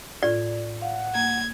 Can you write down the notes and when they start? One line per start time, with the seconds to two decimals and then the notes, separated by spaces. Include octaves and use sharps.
0.23 A2 F4 D5
0.82 F5 F#5
1.15 A#3 G#6